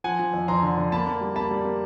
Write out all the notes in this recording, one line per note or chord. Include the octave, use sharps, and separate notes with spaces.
F3 F#5 G#5
F3
F2
F2 A#5 C6
D3
D3
A#3 A5 B5
A#3
G3
A#3 A5 B5
G3
A#3